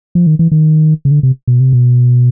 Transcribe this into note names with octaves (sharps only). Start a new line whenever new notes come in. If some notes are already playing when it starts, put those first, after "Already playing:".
F3
D#3
E3
D#3
C#3
D3
C3
B2
C3
B2